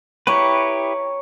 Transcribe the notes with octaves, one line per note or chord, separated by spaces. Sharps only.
E4 G4 B4 C#5 A#5 C#6